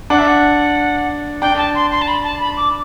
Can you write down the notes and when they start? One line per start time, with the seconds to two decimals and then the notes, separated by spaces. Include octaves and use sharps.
0.10 D4 F#5
0.19 E5
0.28 F#5
1.42 D4 G5
1.58 A5
1.75 C6
1.92 C6
2.02 A5
2.08 B5
2.24 A5
2.40 B5
2.57 D6